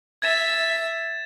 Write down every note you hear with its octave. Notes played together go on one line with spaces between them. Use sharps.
E5 G#6 A6 E7